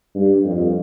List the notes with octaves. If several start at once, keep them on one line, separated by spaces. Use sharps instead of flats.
G2
F2